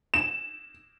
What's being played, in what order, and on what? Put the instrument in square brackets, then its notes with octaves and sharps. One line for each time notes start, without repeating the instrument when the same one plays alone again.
[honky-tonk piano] E7